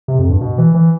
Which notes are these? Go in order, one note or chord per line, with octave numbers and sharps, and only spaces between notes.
C3
F2
G2
B2
E3
E3